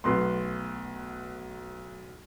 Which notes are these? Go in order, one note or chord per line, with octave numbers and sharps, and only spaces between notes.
B1 A3 B3 C6